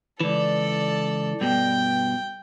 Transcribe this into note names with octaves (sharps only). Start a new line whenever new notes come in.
C#2 E3 A4 D5
G2 B2 G5